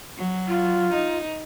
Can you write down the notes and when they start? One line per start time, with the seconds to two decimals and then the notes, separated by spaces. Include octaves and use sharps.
0.18 F#3
0.48 F4
0.93 D#4